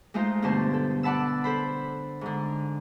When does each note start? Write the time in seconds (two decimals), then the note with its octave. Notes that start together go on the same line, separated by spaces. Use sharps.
0.14 G#3 A3 D#4 F4 C5
0.42 G2 B2 D3 A3 C5 A5
0.74 A4
1.03 D5 F#5 A5 B5 E6
1.44 A4 C5 B5
2.21 G#2 D3